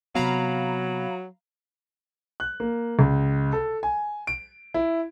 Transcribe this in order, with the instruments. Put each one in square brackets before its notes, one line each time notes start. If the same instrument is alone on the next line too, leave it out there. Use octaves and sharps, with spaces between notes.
[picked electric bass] C3 B3 [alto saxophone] F#3 [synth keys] F5 A#5 B5
[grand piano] F#6
A#3
C#2
A4
G#5
D7
E4